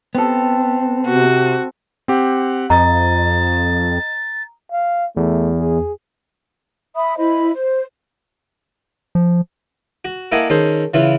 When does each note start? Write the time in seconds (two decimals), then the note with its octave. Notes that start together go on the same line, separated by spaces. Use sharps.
0.15 B3 C4 A4
1.06 C3 F#4
2.08 C4 G4 F#5
2.70 F2 D#5 A#5 A6
4.72 F5
5.17 E2 A3
5.60 G#4
6.95 E5 B5 D#6
7.18 E4 C5 D#5 B5
7.52 C5
9.15 F3
10.05 F#4
10.32 A#3 E4 A4 D#5 F#5 G#5
10.50 D#3 C#4 G#4 A4 C5
10.94 C#3 E3 E4 F4 B4